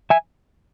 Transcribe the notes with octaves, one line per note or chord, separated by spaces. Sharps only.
E5 G#5